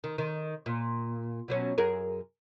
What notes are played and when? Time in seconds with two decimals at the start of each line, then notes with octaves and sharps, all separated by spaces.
0.04 D#3
0.18 D#3
0.66 A#2
1.48 B2 F#3 C#4
1.78 F#2 G#4 A#4